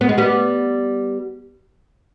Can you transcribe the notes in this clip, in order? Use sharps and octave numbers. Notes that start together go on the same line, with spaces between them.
B3
G#3
G3 B3